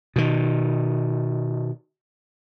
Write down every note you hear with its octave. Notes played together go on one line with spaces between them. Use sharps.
B2 D#3